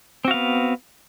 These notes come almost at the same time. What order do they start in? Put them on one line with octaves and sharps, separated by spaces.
C4 F#4 F5 B3